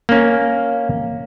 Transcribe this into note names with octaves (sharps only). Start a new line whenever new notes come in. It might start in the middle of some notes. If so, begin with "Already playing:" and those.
A#3 C#4